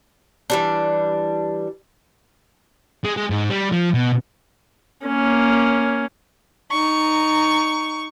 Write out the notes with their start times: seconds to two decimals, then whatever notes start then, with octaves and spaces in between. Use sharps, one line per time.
0.50 E3 G3 D4
3.05 G#3
3.17 G#3
3.30 G#2
3.50 G3
3.72 F3
3.94 B2
5.06 A#3 C#4
6.71 D#4 C#6